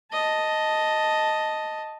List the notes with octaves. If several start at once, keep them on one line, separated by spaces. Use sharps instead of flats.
D#5 A5